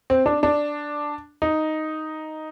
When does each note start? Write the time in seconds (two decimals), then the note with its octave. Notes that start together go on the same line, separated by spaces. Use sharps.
0.10 C4
0.26 D4
0.43 D4
1.42 D#4